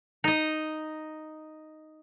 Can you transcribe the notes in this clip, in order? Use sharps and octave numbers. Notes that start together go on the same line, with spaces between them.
D#4 D#5